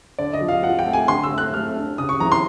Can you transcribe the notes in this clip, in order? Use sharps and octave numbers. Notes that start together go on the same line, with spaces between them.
D3 D5
D#5
F3
F5
F3 F#5
G5
A3
G#5
D3 C6
E6
A3
F#6
A3 F6
D4
C#3 D#6
C#6
E3 A#5
C6